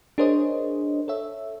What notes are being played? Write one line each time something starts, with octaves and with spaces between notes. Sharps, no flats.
D4 G#4 A#4 C5 C#5 D#5
A4 C#5 E5